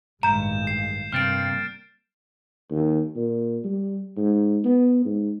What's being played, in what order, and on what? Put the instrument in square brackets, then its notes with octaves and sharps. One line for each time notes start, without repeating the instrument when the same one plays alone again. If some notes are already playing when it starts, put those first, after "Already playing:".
[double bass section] A1 D#3 G#3 [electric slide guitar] G2 [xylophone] A#5 [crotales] G6 E7
[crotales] C7
[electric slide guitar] G2 C3 [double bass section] G3 A#3 [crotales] F6 A6 D7
[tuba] D#2
A#2
G3
G#2
B3
G#2